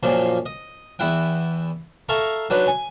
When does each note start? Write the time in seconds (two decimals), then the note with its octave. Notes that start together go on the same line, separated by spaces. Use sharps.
0.03 F#2 A#2 F3
0.46 D#5
0.99 E2 E4 F#5 G5
2.09 A4 E5 F5 A#5 C#6
2.50 F#3 D4 D#4 B4
2.67 G#5